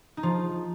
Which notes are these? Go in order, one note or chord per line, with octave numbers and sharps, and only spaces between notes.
D#4
F3 F4